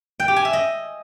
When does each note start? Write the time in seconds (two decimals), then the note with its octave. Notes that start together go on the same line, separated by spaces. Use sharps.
0.20 G5
0.28 G4
0.36 G#5
0.45 E5
0.53 D#5